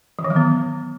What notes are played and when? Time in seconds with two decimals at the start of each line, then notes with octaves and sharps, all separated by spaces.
0.19 E3
0.24 D#3
0.30 F#3
0.36 B3